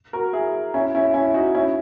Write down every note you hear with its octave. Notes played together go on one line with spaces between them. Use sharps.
F#4 A#4
E4 G#4
C#4 E4
C#4 E4
C#4 E4
D#4 F#4
C#4 E4